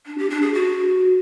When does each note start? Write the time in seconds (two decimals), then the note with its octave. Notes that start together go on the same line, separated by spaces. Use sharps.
0.06 D4
0.18 G4
0.30 D4
0.42 G#4
0.54 F#4